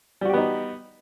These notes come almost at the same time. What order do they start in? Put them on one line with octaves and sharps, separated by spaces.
G3 F#4 G4 B3 D#4